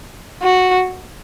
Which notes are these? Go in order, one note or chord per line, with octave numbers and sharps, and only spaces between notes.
F#4